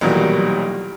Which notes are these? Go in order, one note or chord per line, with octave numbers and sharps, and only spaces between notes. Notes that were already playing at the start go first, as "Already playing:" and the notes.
B1 A#2 D#3 E3 F#3 G3